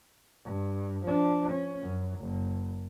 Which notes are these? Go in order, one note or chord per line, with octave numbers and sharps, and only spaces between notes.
G2
F3 D4
C#4
F#2
F#1